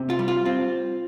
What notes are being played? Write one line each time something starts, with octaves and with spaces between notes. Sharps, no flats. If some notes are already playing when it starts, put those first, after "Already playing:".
Already playing: C3
F4
G3
F4
C4 F4